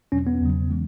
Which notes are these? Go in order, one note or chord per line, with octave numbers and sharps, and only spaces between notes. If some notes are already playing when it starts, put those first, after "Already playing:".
E2 B2 F#3 C#4
B3
E2 C#3 F#3
E3 G#3